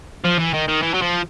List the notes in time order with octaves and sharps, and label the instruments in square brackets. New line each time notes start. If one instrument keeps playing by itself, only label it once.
[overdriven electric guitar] F3
E3
D#3
D#3
E3
F#3
F3